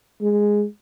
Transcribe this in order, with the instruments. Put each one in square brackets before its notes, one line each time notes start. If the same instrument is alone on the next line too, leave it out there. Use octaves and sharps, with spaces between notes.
[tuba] G#3